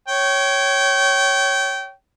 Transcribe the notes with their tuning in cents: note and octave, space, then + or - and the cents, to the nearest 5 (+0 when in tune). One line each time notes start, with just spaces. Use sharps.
C#5 +0 G5 -25